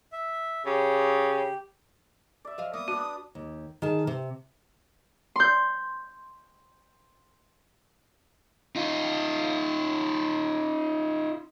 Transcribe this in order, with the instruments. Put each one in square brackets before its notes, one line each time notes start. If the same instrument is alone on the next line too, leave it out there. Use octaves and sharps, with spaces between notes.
[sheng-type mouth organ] E5
[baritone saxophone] C#3 [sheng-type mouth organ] G4
[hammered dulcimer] D5 E5
[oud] F3 D#5 F5
[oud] A#3 B3 E4 [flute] D#6
[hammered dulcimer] D4 B4 [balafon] F#4
[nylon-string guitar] D#2
D#3 G#4 A5
C3
[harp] C6 G6
[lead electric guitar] D#4 F4